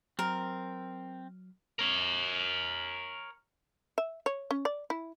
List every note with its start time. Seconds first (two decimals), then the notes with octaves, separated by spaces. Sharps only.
0.19 F#3 C4 A#4 F6
1.79 A#4 C#5
3.98 E5
4.26 C#5
4.51 C#4
4.65 D5
4.90 E4